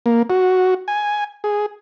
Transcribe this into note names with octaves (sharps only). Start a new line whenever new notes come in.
A#3
F#4
G#5
G#4